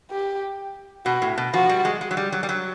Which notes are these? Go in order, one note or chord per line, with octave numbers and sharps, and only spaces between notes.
G4
B2 F#4
A2
B2
F3 F#4
G3
G#3
G#3
F#3
G3
F#3
G3
F#3